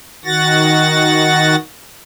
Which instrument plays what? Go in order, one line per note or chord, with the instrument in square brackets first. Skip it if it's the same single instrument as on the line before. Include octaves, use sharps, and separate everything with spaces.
[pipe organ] D#3 F#4 F#5 A6 A#6